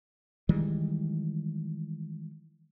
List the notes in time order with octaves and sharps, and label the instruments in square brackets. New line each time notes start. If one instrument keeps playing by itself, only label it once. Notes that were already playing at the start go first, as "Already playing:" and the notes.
[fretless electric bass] D#3 E3 G3 G#3